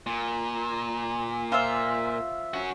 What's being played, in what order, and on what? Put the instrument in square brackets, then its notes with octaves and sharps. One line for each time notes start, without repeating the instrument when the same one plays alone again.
[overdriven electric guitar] A#2
[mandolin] F4 C5 E5
[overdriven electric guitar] C#4 F#4